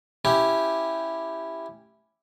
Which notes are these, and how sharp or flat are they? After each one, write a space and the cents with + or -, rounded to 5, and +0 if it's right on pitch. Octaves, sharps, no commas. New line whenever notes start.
C#4 +0 E4 +0 G4 +0